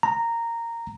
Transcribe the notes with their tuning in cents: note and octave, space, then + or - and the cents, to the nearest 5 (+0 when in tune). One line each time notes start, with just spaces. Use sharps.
A#5 -10